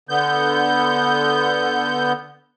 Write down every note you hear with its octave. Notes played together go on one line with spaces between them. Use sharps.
D3 B3 G6